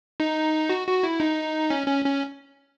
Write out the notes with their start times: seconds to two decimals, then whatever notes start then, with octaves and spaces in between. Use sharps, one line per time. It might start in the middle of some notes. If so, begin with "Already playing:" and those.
0.20 D#4
0.69 F#4
0.87 F#4
1.03 E4
1.20 D#4
1.70 C#4
1.87 C#4
2.05 C#4